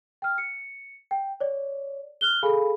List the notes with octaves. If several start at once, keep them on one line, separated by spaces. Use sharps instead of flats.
G5 F6
C#7
G5
C#5 D5
F6 F#6 G7
G#4 A4 F5 G#5 B5